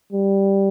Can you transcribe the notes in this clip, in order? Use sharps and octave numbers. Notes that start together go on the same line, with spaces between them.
G3